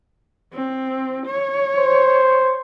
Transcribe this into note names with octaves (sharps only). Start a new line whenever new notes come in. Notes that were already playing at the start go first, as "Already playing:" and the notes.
C4
C#5
C5